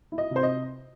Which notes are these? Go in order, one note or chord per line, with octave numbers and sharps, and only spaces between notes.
E4
D#5
C3 C5
D#5